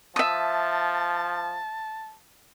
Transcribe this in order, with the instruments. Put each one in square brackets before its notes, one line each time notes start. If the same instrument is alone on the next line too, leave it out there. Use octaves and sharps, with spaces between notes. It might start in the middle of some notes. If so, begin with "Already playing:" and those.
[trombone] F3 [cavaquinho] E5 D#6 [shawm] A5